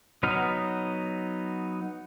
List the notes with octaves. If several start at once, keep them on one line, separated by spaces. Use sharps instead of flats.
F#3 B3 D#4 D#6 F6